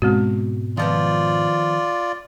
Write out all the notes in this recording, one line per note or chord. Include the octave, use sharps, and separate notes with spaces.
G#2 B2 G#3 C4 F#4
D#3 F3 B3 F4 D5